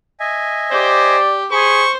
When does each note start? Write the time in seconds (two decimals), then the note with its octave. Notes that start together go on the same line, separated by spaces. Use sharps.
0.20 D#5 E5 G#5
0.72 G4 C5 D5
1.52 G#4 C5 B5 C#6